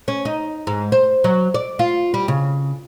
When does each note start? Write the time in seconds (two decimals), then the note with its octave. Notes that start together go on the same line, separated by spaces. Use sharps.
0.08 C#4
0.25 D#4
0.67 G#2
0.92 C5
1.24 F#3
1.54 D5
1.79 F4
2.14 G3
2.28 C#3